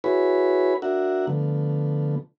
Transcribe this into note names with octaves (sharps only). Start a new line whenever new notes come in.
E4 F#4 G#4 B4 C#5 B5
D4 F#4 A#4 E5 F#5
D3 F3 A3 B3